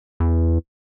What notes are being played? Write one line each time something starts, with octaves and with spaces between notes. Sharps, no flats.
E2